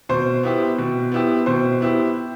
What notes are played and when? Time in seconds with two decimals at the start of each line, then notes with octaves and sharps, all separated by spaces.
0.09 B2 C5
0.43 B3 E4 G4
0.78 B2
1.12 B3 E4 G4
1.46 B2 C5
1.81 B3 E4 G4